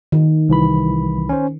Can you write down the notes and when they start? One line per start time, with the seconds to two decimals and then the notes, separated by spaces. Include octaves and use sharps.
0.12 D#3
0.49 C2 E3 B5
1.29 C#4 C5